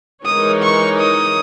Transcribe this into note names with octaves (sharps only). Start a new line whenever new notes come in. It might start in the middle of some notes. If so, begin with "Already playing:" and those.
E3 G#3 D#4 A#4 C#5 D#6
C#6
D#6